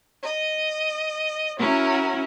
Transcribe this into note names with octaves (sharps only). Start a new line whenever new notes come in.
D#5
C#4 E4 F#4 A#4